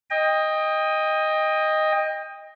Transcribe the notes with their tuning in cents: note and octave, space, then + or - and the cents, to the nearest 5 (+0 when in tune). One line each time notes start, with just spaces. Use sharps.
D#5 +0 G5 +30